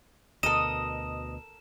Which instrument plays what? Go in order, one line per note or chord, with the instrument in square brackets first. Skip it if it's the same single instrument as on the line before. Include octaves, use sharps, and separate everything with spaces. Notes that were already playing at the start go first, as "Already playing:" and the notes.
[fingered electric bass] D2 B2 [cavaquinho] A4 A#4 [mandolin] D#5 [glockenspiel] E7